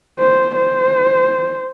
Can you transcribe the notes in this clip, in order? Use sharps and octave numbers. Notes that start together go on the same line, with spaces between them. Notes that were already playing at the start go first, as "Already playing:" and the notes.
C5
C5